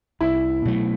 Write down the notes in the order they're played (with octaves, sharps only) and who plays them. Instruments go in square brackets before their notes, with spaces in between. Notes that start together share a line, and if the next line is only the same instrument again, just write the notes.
[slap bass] C2 [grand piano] E4
[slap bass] B2 F#3 A3